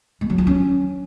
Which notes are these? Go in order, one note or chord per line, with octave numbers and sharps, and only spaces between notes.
G#3
F#3
F4
C#4